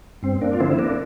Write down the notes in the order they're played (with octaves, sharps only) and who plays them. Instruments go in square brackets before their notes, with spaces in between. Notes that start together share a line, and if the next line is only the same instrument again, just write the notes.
[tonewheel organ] G2 C4
A#3 D4
F4
D3 F3 C4 E4
E4
A#3 D4